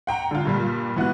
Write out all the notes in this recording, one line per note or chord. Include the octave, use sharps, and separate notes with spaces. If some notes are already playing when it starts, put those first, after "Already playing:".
F#5 G5 A#5
D3 F4
G2 A#2 G3
E3 B3 F#4 F#6